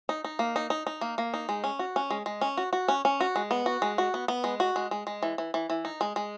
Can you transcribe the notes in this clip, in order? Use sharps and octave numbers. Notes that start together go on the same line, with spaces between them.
D#4
D#4
A#3
D#4
D#4
D#4
A#3
A#3
D#4
G#3
C#4
F#4
C#4
G#3
G#3
C#4
F#4
F#4
C#4
C#4
F#4
G#3
B3
F#4
G#3
F#4
B3
B3
G#3
F#4
G#3
G#3
G#3
E3
E3
E3
E3
D#4
G#3
G#3